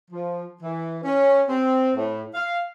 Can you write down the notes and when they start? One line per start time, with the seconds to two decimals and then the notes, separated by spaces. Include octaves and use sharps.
0.11 F3
0.62 E3
1.04 C#4
1.49 C4
1.96 A2
2.35 F5